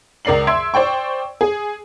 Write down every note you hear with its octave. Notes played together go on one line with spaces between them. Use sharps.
C#2 A#4 D5 C7 F#7
E5 C6 E6 G#6 D7
C5 D5 G5 C#6
G#4